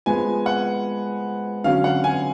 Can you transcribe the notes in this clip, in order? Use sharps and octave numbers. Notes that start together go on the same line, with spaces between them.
F3 G#3 B3 G#5
F#5
D3 F#3 C#4 F5
F#5
G#5